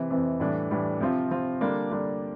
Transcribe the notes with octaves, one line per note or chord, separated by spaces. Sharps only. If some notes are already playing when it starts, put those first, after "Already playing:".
Already playing: C3 E3
F2 C3 E3
A2 E3 G3 D4
A2 E3 G3 D4
C3 F3 C4 F4
C3 F3 C4 F4
D3 G3 A#3 D4
D3 G3 A#3 D4